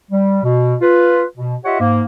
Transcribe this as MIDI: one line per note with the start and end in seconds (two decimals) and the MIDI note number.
0.11 0.39 55
0.43 0.75 47
0.81 1.23 65
0.81 1.23 71
1.37 1.55 47
1.65 1.77 65
1.65 1.77 67
1.65 1.77 73
1.65 1.77 75
1.65 1.77 76
1.65 1.77 78
1.80 2.03 44
1.80 2.03 58